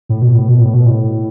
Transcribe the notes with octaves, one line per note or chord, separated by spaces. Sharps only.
A2
B2
A2
B2
A2
B2
A2